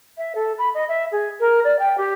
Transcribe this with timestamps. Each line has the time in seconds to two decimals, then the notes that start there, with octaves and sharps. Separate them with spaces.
0.17 E5
0.35 A4
0.58 B5
0.74 D#5
0.88 E5
1.11 G#4
1.40 A#4
1.64 D5
1.79 G5
1.97 G4